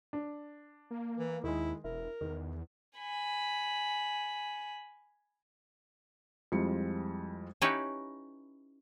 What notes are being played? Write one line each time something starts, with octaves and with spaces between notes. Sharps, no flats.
D4
A#3
E3
D#2 D#3 G#3 E4
E1 E4 A#4
E2 D#3
G#5 B5
F2 G3 G#3 E4 F4 C#7
C#4 D#4 E4 G4 B4 C#5